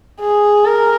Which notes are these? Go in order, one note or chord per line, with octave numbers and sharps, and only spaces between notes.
G#4
A#4